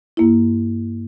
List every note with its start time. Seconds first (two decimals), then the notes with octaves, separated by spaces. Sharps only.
0.17 G2 A#3 E4